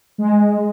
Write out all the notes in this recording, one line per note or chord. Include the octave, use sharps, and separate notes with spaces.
G#3